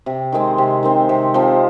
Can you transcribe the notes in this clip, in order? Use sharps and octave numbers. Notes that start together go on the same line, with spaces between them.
C3
D#3 G#3 C4
C3
D#3 G#3 C4
C3
F3 C4